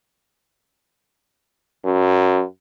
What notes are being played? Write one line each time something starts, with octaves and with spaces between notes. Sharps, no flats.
F#2